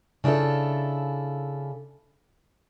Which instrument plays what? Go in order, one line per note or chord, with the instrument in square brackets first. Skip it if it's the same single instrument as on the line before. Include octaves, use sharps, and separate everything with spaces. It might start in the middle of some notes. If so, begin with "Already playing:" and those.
[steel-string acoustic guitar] C#3 D4 E4 F4 A4